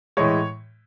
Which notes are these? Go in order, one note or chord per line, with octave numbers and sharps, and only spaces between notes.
A2 E3 G#3 C#5